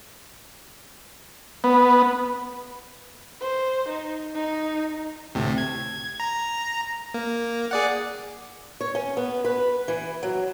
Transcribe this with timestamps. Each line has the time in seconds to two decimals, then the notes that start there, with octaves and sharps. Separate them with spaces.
1.64 B3
3.41 C5
3.89 D#4
4.34 D#4
5.35 D2 A2 C3
5.58 G#6
6.20 A#5
7.14 A#3
7.71 G#4 D5 F#5
8.81 C#5
8.95 C#4
9.17 B3
9.45 B4
9.88 E3
10.23 F#3